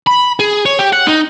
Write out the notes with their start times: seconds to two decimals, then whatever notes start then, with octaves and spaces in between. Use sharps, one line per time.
0.07 B5
0.40 G#4
0.66 C#5
0.79 G4
0.93 F#5
1.07 D#4